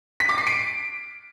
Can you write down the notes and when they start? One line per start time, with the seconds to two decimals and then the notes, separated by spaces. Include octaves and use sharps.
0.20 B6
0.29 D6
0.38 C7
0.47 D7